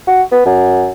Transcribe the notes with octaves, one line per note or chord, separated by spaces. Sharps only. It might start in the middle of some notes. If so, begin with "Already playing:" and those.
F#4
B3
F#2